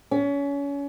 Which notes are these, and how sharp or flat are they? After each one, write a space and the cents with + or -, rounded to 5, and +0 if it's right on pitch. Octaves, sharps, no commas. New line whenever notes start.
C#4 +30